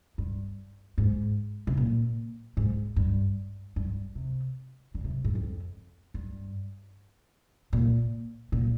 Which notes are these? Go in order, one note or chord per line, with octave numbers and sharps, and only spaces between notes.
G2
G#2
C3
A#2
G#2
G2
G2
C3
D3
C3
G#2
F2
G2
A#2
A#2